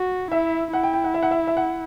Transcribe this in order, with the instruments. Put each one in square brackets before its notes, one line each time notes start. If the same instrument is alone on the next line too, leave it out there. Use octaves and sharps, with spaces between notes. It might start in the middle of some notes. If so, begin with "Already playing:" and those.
Already playing: [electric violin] F#4
[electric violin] E4 [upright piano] E5
[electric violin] E4 [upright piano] F#5
[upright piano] G5
G5
F#5
E5
F#5
E5
E5
F#5